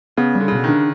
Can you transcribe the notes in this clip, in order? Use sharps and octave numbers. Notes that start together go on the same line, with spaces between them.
C#3 B3
G3
D3
C#3
B2 D3
D#3 D4